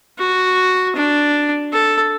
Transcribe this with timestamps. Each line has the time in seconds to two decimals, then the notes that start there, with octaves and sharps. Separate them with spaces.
0.19 F#4
0.96 D4
1.73 A4